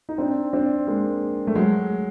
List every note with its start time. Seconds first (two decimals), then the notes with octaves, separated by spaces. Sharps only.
0.09 D#4
0.18 C4 D4
0.53 C4 D4
0.87 G#3 A#3
1.47 A3
1.55 F#3 G#3